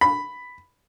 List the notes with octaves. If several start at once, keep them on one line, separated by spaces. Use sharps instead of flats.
B5